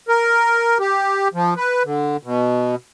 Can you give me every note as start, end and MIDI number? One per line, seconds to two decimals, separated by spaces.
0.08 0.78 70
0.79 1.28 67
1.34 1.54 53
1.57 1.83 71
1.84 2.17 50
2.23 2.75 47